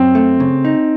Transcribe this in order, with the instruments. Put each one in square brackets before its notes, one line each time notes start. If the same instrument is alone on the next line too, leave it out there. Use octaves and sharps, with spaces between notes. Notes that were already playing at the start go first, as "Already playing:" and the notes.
Already playing: [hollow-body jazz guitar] F#2 [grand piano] C4
[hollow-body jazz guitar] A3
C#3
D#4